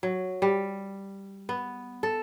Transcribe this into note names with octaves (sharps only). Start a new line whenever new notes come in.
F#3
G3
B3
A4